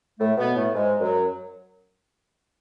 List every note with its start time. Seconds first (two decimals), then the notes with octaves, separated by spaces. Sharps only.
0.19 A2 A3
0.37 B2 B3
0.55 A2 A3
0.74 G#2 G#3
1.00 F#2 F#3